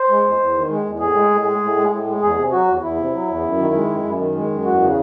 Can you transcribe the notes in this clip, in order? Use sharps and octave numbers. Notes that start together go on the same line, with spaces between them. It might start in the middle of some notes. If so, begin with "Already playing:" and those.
Already playing: C5
G#3
E2
E2
D#3
G#3
E2
A2 G#4
G#3
A2
G#3
A2
G#3
A2
G#3
E2 G#4
C3
F#3 F#4
E2
E2 E4
C3
F#3
E2
F#2
D#3
G#3
F#2
F#2
D#3
G#3
F#2
E2 F#4
C#3